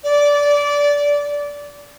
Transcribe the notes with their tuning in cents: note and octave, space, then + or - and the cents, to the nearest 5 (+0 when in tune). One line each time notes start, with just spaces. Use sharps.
D5 -20